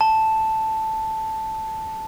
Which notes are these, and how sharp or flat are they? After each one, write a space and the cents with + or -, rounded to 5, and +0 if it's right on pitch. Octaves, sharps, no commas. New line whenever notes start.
A5 +0